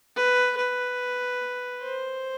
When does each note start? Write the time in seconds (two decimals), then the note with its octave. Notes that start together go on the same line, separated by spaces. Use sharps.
0.16 B4
0.57 B4
1.82 C5